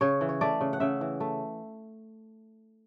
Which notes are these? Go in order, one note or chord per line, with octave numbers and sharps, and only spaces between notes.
C#3 C#5
E3
C#5
A3 D5
C#3
F#5
C#3 E5
E3
A3